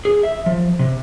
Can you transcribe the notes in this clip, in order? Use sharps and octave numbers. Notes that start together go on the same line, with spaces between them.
G#4
E5
F3
C3